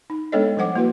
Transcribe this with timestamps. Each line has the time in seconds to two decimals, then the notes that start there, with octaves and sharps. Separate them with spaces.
0.10 D#4
0.32 G#3 B3 D4 A4 C#5 D#5
0.57 F3 G3 C5 F#5 D6
0.76 A#3 E4 F#4 B4